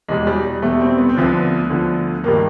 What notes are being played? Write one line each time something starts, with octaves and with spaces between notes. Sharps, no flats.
E2 B2 G3 G#3
G3
E2 B2 G3 A3
C4
B3
C4
D2 D3 F3 B3
D2 D3 F3
G2 D#3 G3 A#3